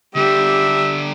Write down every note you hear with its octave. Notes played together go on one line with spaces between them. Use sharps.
D3 G3 G4 E5